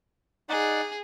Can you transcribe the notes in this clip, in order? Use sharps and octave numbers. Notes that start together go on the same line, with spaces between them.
D#4 G#4 D5 F#5